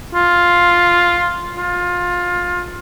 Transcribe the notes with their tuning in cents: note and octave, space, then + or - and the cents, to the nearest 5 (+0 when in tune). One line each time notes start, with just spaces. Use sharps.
F4 +5
F4 +20